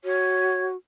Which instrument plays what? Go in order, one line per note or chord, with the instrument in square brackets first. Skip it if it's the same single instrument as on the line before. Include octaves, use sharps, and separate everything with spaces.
[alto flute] F#4 [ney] C#5